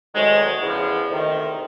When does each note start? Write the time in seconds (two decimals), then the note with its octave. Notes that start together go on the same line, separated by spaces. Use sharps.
0.14 D2 C3 D#3 F#3 G#3
0.62 E2 C#3 F3
1.10 D2 C3 D#3